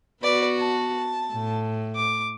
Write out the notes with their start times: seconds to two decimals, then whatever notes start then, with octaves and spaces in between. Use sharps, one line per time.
0.22 B3 F#4 B4 D5
0.58 A5
1.33 A2
1.96 D6